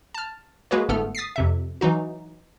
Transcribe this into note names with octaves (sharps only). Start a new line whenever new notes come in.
A5 F6
G#3 A#3 F#4 G#4 B4 C#5
G1 G#2 A3 B3 A4 F6
D#6 A6 B6 C7
F2 C3 E5
E3 F#3 D#4 F#4